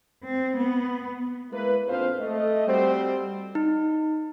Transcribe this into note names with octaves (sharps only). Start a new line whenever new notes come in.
C4
B3
G#3 A#3 E4 B4
A#1 F2 F3 C4 C5 F5
A3 D#5
G3 C4 F#4 C5
D#4